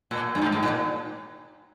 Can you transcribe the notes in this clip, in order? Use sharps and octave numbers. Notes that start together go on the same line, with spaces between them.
A#2
G2
G#2
G#2
A#2